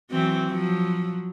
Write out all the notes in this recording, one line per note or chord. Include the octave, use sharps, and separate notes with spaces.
E3 F#3 C4
F3 F#3